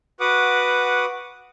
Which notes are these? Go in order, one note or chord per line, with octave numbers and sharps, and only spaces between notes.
F#4 B4 F#5 D6 D#6